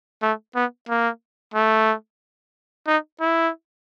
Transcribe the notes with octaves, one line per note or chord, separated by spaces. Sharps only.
A3
B3
A#3
A3
D#4
E4